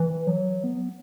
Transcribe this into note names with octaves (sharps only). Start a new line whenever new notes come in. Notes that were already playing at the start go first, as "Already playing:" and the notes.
Already playing: E3
F#3
B3